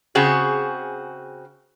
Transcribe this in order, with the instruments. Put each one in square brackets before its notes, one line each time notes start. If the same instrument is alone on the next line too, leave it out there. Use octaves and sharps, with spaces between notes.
[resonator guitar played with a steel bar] C#3 C4 F#4 G#4